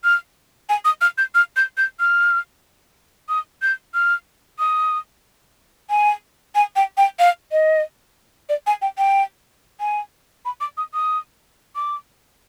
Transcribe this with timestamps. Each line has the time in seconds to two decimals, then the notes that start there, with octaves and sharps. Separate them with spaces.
0.04 F6
0.69 G#5
0.85 D#6
1.01 F6
1.18 G6
1.35 F6
1.56 G6
1.77 G6
2.00 F6
3.29 D#6
3.62 G6
3.94 F6
4.59 D#6
5.90 G#5
6.55 G#5
6.76 G5
6.97 G5
7.19 F5
7.52 D#5
8.49 D5
8.67 G#5
8.82 G5
8.98 G5
9.80 G#5
10.45 B5
10.61 D6
10.77 D#6
10.94 D#6
11.76 D6